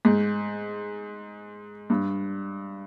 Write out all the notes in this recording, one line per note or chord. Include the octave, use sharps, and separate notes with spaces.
G#2
G2